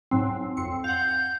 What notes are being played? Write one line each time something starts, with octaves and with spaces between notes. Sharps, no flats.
G#2 F#3 C4
F2 C4 C#7
F5 F#5 G6